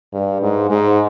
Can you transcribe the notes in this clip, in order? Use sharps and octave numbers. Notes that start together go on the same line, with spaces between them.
G2
G#2
G#2